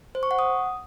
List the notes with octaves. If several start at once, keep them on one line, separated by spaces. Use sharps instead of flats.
C5
C#6
F#5
D#6